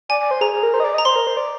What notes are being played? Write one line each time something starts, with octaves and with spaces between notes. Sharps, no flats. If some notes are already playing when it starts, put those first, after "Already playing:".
D5 G#5
D5
C5
G#4 A#5
G#4
A#4
C5
D#5
D5
D#5 A#5
C5 C6
A#4
C5
D5